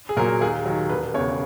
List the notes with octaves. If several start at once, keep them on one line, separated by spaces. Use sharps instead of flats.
G#4
A#2 F#3 A#4
D#2 G#4
D#3 F#3
E1 B4
E2 C#3 C#5